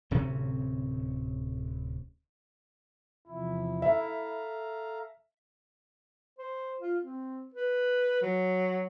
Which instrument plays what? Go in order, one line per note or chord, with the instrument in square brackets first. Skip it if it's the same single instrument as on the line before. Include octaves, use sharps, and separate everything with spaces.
[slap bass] D1 C3 C4 C#4
[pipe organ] E2 C3 F3 [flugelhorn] E4
[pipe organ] A4 F5 A#5 [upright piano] E5
[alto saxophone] C5
F4
C4
B4
F#3